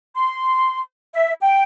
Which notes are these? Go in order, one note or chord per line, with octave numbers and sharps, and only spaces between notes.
C6
E5
G5